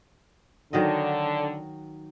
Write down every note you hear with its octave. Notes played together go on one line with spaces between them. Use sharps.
D3 D#3 F#3 D#5